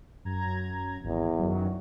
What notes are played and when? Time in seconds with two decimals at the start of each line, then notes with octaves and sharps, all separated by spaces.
0.25 F#2 A#5 G#6
1.03 G#1 E2
1.39 F#2 D#3 F#3